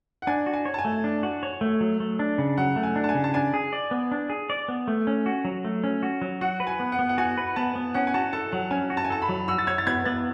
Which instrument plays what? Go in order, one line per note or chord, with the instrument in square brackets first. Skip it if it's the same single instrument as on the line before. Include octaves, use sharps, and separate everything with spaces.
[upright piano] F#5
[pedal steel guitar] D4 [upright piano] G#5
[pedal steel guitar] F#4
[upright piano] G#5
[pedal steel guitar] C#5
[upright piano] A5
G#5
[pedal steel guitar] A3
D4
F#4
C#5
A3
F#3
A3
D4
C#3
[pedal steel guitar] F#3 [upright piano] F#5
[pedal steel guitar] A3
[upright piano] G#5
[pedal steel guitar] D4
[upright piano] A5
G#5
[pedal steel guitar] C#3
[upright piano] A5
[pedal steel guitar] D4 [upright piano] G#5
[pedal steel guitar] G#4
D5
B3
D4
G#4
D5
B3
A3
C#4
F#4
F#3
A3
C#4
F#4
F#3
[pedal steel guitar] F#4 [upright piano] F#5
[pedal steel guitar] B4
[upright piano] G#5
[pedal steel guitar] B3
[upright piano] F#5
[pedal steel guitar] B3
[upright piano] F#5
[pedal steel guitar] F#4 [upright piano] G#5
[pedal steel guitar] B4
[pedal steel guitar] B3 [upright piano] A5
[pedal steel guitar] B3
[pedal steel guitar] C#4 [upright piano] F#5
[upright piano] G#5
[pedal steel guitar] F#4 [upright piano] A5
[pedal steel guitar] A4 [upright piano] A5
[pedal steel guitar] F#3 [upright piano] F#5
[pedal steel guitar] C#4 [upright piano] G#5
[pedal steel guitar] F#4
[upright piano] A5
G#5
[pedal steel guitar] A4 [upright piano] A5
[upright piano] B5
[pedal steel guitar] F#3
[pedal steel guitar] F#4 [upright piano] E6
[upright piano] A6
[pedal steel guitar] C#5 [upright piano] G#6
[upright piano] A6
[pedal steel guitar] B3 [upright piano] G#6
[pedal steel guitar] B3 [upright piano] A6